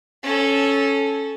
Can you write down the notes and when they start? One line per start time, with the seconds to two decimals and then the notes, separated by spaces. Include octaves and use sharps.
0.23 C#4 A4